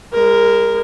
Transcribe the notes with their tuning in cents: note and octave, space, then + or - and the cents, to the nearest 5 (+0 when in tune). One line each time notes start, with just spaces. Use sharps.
G#3 -35 A#4 +0